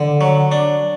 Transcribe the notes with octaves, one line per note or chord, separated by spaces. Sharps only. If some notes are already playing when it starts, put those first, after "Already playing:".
Already playing: D3
F#3
D4